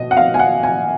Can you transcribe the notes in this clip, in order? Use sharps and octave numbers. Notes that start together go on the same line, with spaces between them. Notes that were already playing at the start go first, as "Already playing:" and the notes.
Already playing: B2 D#5
F#5
F5
G#5
F#5
G#5